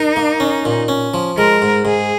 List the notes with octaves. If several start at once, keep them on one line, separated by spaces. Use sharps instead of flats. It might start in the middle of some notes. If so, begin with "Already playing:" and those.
Already playing: D#4 A#4
A#3
C#4
A#2
C#4
F3
G#3 A#4
G#2
G#2 G#4